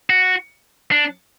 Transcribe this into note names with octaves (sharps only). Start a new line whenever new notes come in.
F#4
D4